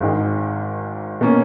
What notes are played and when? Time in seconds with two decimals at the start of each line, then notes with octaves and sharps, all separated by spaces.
0.01 G#1 G#2 D#3 G#3
1.21 B2 A#3 C#4